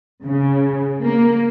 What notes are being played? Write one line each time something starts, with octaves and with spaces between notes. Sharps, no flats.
C#3
A#3